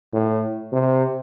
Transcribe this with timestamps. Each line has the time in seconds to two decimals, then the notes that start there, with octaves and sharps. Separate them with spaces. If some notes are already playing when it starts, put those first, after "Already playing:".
0.13 A2
0.73 C3